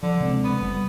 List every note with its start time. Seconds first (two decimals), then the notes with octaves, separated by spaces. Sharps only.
0.03 D3 F3
0.20 C3 G#3 C4
0.44 B3
0.60 F#1 G3